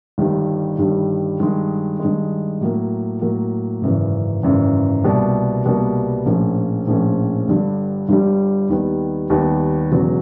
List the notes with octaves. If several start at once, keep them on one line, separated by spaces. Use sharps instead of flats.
G1 G2 D#3 G3
G1 G2 D#3 G3
G2 D#3 G#3
G2 D#3 G#3
A2 F#3 A#3
A2 F#3 A#3
G#1 F#2 C#3 E3
G#1 F#2 C#3 E3
C2 B2 G3 A#3 D4
C2 B2 G3 A#3 D4
A#1 A2 F3 A#3 C#4
A#1 A2 F3 A#3 C#4
G1 G2 D3 G3
G1 G2 D3 G3
D#2 D#3 G3 B3
D#2 D#3 G3 B3
E1 E2 C#3 F#3